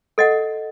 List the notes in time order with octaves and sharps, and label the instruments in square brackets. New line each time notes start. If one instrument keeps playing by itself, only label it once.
[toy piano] A4 D#5 F#5